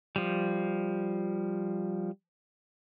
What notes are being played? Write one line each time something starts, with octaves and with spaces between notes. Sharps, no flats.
F3 G3